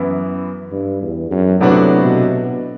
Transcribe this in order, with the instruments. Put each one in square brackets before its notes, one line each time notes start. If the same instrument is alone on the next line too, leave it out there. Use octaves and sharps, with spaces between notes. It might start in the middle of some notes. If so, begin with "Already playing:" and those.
Already playing: [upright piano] F#2 E3 B3 E4
[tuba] G2
E2
F#2
[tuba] A2 [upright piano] C3 F#3 B3 D4 F#4
[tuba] B2